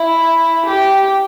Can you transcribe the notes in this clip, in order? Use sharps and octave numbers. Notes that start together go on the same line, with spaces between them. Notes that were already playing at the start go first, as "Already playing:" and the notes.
Already playing: E4
G4